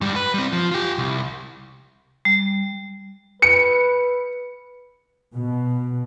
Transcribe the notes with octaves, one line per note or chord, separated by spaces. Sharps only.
G#2 G3
B4
G3 C4
F3
F4 G4
C2
G3
B4 C#7
B2